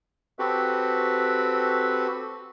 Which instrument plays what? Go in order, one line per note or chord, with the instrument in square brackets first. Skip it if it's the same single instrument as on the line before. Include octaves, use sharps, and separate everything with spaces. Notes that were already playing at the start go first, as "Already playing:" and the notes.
[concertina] C4 F#4 G4 A4 B4